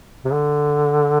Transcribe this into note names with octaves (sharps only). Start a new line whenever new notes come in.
C3
D3